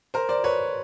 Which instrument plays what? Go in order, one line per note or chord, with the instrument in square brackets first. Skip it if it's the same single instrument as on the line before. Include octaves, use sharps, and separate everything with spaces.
[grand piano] A#4 C5
C5 D5
B4 C#5